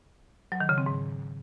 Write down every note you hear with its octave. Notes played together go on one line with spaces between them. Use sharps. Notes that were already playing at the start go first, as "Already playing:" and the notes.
F#3
D#3
C#3
C4
G#2